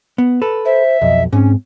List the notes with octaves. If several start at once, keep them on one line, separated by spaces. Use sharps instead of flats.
B3
A4 B4
C5 E5
B1 F2 D#5
G#2 C4 C#4